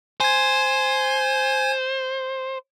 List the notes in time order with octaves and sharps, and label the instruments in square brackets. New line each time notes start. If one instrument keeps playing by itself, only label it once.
[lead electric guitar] C5 [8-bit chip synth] G#5 G#6